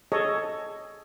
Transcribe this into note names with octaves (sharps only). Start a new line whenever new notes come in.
G#4 A4 C#5 D#5